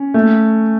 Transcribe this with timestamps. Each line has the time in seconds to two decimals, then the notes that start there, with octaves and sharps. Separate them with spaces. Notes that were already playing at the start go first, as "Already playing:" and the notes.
Already playing: C#4
0.14 A3